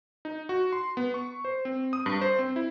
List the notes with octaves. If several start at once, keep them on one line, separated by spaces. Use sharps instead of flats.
D#4
F#4
C6
B3
C#6
C5
C4
D#6
G2
C5
C4
E4